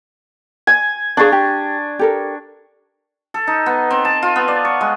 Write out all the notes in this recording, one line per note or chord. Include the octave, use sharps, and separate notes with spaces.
G#5
D4 G#4 D5 F5 C#6
G4
G4 A4 A#4
A4
D#4
B3
C4
A5
F4
B3
D5
C#6
G#3